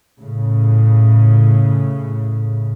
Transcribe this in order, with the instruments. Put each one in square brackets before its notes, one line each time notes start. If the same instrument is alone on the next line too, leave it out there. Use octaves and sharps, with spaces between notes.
[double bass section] A2 C#3